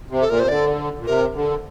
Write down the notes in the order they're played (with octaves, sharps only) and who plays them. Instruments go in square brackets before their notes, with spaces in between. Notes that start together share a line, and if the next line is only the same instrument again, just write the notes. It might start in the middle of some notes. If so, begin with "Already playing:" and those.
[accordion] C3
[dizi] A4
[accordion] A#2 [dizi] A#4
[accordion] C3 [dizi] C5
[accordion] D3 [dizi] D5
[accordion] A#2
[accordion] C3 [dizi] A#4
[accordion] D3